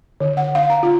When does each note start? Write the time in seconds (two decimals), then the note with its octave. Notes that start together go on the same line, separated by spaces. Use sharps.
0.20 D3
0.37 F#5
0.55 F5
0.70 A#5
0.83 F4